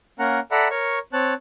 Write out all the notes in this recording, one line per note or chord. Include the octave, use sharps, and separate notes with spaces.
A#3 C#4 A#4 F#5 A#5
A4 D5 E5 F#5 A#5 B5
A#4 C#5 C#6
C4 C#5 A5 F#6